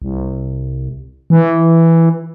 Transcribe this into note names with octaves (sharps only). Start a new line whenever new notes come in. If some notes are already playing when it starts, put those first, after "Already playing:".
C2
E3